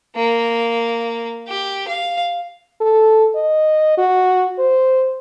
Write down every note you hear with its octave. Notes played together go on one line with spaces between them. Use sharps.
A#3
G4
F5
A4
D#5
F#4
C5